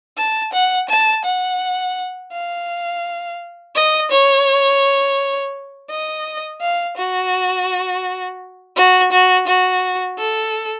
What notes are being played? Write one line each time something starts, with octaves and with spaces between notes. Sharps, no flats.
A5
F#5
A5
F#5
F5
D#5
C#5
D#5
F5
F#4
F#4
F#4
F#4
A4